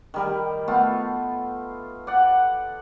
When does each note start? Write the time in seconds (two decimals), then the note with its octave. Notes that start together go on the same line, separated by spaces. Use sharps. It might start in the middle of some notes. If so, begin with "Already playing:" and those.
0.14 D#3 G3 A#4
0.68 A3 B3 F4
2.07 D5 F#5